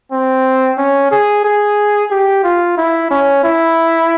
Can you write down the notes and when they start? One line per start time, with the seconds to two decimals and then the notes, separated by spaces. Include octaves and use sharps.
0.12 C4
0.78 C#4
1.11 G#4
1.45 G#4
2.11 G4
2.43 F4
2.77 E4
3.10 C#4
3.44 E4